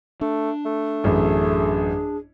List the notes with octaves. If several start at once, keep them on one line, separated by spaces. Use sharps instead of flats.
A3 D4
A3
A1 F#2 G#4